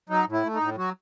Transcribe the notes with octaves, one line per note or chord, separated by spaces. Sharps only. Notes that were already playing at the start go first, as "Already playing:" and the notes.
F#3 D#4
A2 E4
A3
D#4
A2
F#3 F#4